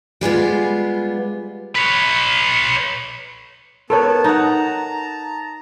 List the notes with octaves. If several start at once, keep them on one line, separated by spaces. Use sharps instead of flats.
G3 G#3 B3 F4
B4 C#5
B3 A4 A#4 C#5 A5
D#4 F#5 A5 A#5